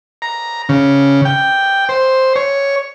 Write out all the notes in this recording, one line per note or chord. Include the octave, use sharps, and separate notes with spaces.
A#5
C#3
G5
C5
C#5